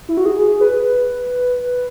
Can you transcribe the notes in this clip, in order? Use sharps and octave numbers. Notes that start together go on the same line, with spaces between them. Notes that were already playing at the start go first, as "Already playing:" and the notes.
E4
F#4
G#4
B4